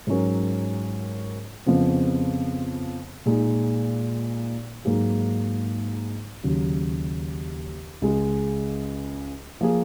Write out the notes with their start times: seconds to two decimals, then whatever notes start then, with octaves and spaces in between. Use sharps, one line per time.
0.07 G#2 F#3 C#4 F#4 A#4
1.66 F2 C#3 F3 B3
3.26 A#2 G#3 D#4
4.85 G#2 F#3 A#3 D#4 G#4
6.43 D#2 C#3 F#3
8.02 C#2 C#3 G#3
9.61 F3 A#3 F4 G#4